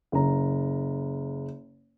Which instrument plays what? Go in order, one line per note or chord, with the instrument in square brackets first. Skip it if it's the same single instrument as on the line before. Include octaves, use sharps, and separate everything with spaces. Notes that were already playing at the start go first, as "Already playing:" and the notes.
[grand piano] F#1 A#5